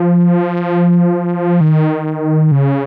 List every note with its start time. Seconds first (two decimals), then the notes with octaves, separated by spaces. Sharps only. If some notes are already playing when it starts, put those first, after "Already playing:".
Already playing: F3
1.61 D#3
2.52 C#3